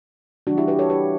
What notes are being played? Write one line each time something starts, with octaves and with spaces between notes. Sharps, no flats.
C#3 E3 G3 D4 F#4
E4 G4
G4 B4
A4 C#5
G4 B4